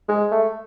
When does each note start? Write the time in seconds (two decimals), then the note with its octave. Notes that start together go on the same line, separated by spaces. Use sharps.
0.08 G#3
0.31 A3